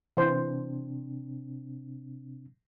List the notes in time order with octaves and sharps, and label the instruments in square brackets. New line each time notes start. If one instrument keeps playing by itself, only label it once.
[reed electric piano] C3 C4 D4 [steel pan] E3 C5